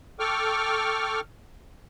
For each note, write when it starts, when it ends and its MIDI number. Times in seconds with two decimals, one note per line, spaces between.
0.19 1.20 69
0.19 1.20 79
0.19 1.20 85
0.19 1.20 86
0.19 1.20 89